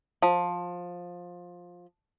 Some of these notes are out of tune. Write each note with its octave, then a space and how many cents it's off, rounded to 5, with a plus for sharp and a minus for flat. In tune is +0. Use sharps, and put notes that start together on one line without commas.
F3 +15